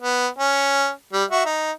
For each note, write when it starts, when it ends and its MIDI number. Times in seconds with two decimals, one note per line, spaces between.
0.01 0.27 59
0.38 0.90 61
1.13 1.24 55
1.31 1.44 66
1.31 1.44 76
1.45 1.72 63